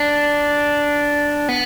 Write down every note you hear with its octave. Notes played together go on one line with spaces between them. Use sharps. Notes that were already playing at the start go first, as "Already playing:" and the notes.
Already playing: D4
B3